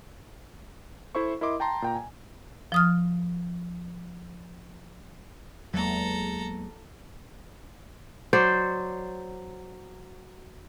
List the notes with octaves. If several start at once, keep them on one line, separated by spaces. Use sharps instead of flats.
E4 A4 C5 E5 C#6
E4 A#4 D#5 C6 D6
G5 A5 A#5 C6
A#2 G5 A#5
G#5
F3 D#6 F6
E2 F#3 G#3 A#3 A4 A#5
F#3 C5 D5